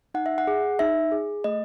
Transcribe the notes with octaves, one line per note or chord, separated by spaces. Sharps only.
D#4 F#5
E5
F#5
G#4
D#4 E5
G#4
A3 D#5